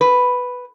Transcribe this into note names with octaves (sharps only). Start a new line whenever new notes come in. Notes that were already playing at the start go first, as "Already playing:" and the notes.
B4